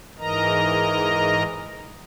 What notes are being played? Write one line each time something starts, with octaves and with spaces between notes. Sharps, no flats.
G#2 E3 A#4 D#5 A#5